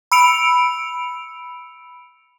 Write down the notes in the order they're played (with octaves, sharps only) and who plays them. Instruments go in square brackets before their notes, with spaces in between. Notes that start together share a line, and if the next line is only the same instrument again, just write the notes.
[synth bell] B5 E6 C#7 D7 F7